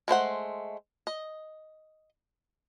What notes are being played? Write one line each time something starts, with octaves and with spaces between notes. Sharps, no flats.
G#3 A3 C5 F#5
D#5